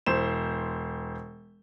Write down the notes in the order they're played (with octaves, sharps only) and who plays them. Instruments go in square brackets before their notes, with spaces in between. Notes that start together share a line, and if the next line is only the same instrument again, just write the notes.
[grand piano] E1 C5 E7